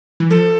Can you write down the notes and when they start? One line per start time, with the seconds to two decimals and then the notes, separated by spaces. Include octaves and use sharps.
0.20 E3
0.30 F3 A4